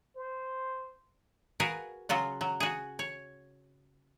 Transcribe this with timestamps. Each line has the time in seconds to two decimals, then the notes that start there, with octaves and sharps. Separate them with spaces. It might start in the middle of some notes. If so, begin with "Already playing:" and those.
0.16 C5
1.60 F#4 G#4 A#4 B4 F5
2.09 C#3 F#3 F4 F#4
2.41 F#3
2.60 F#4 G#4
2.99 C#5